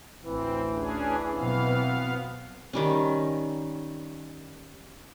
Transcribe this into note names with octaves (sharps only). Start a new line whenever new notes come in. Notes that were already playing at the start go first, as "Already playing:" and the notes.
A1 D2 E3 C4
C#4 D4 G#4
E3
B2 F#3 B3 C4 F5
D#3 G3 C#4